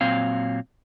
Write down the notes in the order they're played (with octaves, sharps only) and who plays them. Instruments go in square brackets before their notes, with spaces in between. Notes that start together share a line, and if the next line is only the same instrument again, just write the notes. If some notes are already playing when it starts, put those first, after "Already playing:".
[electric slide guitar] A#2 F#3 C4 F5